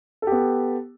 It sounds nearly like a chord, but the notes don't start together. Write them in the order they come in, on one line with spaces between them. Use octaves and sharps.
A4 G4 B3